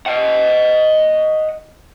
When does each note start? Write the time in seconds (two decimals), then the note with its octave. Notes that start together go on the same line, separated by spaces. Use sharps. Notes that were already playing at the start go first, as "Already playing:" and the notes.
0.06 D#5 F#5